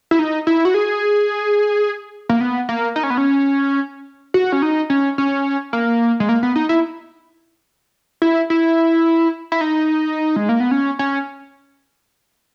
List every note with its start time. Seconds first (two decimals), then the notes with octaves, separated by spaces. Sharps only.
0.11 E4
0.19 D#4
0.47 E4
0.65 F#4
0.74 G#4
2.29 A#3
2.41 B3
2.69 A#3
2.96 D#4
3.03 C#4
3.10 B3
3.18 C#4
4.34 F#4
4.52 C#4
4.62 D#4
4.90 C#4
5.18 C#4
5.73 A#3
6.20 G#3
6.29 A#3
6.43 B3
6.56 D#4
6.69 E4
8.22 E4
8.50 E4
9.52 E4
9.61 D#4
10.36 G#3
10.49 A#3
10.60 B3
10.71 C#4
10.99 C#4